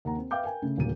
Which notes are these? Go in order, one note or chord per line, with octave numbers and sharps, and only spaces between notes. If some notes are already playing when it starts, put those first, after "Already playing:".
D#2 F#5 A#5
C4
B4 E5 F5 G5 D6 G6
A#4 G5 G#5
C#3 A3
D#1 D2 A#3 D#7